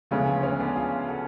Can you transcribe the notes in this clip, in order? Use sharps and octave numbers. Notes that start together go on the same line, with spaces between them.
D2 C#3 F3 G#3 A3 B3
A3
A3 C#4
B3 D4
F4 G#4
F#4 A4